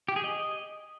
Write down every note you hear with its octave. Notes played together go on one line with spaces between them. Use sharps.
G4
G#4
D#5